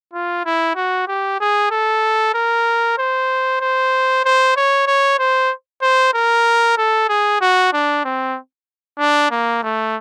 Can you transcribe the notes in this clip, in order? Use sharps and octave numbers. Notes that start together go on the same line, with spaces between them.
F4
E4
F#4
G4
G#4
A4
A#4
C5
C5
C5
C#5
C#5
C5
C5
A#4
A4
G#4
F#4
D4
C4
D4
A#3
A3